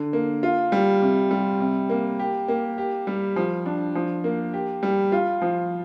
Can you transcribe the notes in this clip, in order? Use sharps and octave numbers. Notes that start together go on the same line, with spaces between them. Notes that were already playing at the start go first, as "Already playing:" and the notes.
Already playing: D3
A#3
F4
G3
C3
G3
C3
A#3
G4
A#3
G4
G3
F3
D4
F3
A#3
G4
G3
F4
F3